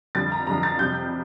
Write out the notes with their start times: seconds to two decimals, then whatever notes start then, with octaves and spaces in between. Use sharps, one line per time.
0.15 F2 D3 G3 A6
0.32 A#5
0.47 F2 D3 G3 A#5
0.63 A6
0.79 F2 C3 G3 G6